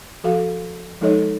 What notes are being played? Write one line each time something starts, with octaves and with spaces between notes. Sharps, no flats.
F3 F#4 A4 F5
F3 G#3 D#4 A4 C#5 D#5